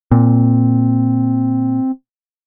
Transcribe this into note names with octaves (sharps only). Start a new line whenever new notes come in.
A#2 C4